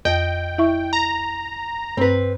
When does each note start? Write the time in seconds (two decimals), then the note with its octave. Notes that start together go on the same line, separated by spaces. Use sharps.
0.05 F2 D#5 G5
0.58 E4 E5 C#6
0.93 A#5
1.97 G2 C4 B4